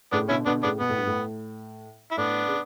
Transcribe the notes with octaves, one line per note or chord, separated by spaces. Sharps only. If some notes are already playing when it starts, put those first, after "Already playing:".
A2 C#3 B3 D4
B2 D3 C#4 E4
B2 D3 B3 D4
A2 C#3 B3 D4
B2 B3
A2
G2
A2
E4
A2 B3 D4
C#3